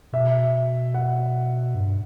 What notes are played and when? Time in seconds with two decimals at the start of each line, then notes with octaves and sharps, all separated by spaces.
0.13 B2 E5
0.94 F#5
1.75 G2